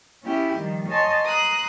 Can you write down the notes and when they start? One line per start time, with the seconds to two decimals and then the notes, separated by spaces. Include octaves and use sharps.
0.23 B3 C#4 E4 G4
0.56 D#3 F3 G3
0.89 C#5 D#5 G#5 A5 C6
1.23 A#5 C6 D#6 F#6